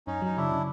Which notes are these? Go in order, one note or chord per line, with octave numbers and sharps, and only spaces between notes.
F#2 C#4 D#4
F#3 D#4
C#3 D4 E4
C#3